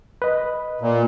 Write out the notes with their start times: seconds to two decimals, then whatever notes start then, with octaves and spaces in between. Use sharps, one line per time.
0.22 B4 D#5
0.81 A#2